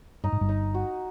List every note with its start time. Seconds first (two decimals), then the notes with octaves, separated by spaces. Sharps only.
0.24 G2 D#4
0.32 G#2
0.41 G1 G2
0.49 D#4
0.74 F#4